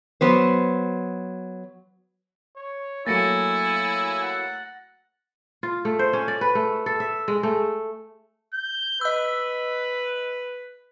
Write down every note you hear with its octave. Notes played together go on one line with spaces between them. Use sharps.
F#3 B3 C5
C#5
F#3 A3 A#3 E4 G#5 A6 A#6 C#7
F#5
F4
A3
C5
C#4
D5
B4
A3
A4
E5
G#3
A3
G6
B4 D#5 E6